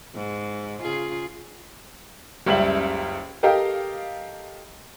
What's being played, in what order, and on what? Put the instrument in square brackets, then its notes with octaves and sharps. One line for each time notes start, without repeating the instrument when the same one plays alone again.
[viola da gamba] G#2
C#3 F4 G#4
[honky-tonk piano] F#1 C#2 G3 E5 F#7
G4 A4 A#4 D#5 F5 G5